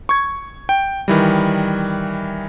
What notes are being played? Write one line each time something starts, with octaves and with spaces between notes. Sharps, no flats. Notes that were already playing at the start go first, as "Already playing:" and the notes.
C#6 G#6
G5
D#3 E3 G3